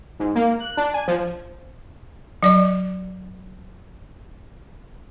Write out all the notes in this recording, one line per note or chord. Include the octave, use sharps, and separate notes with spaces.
G#2
A#3
F#6
D4
G#5
F3
F#3 D5 D6